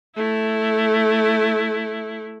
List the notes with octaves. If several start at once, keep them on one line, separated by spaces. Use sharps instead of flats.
A3 E4